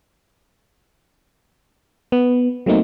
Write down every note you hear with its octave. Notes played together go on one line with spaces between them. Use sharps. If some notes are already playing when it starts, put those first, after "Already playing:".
B3
F#3 A3 A#3 C4 D#4